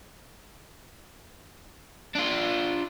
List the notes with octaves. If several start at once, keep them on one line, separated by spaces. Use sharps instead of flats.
D4 F4